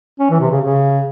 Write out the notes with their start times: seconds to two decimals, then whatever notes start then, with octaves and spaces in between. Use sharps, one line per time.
0.19 C#4
0.30 E3
0.40 C3
0.51 C#3
0.61 C#3